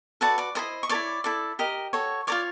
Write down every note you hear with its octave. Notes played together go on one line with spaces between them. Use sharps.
F#4 A4 B4 D5 A5
D5 D6
E4 A4 C5 D#5 D#6
C#6
A4 C#5 D5 D6
E4
E4 A4 D5
G4 A#4 D#5
F#4 A4 C#5
F4 A#4 C#5 D5 D6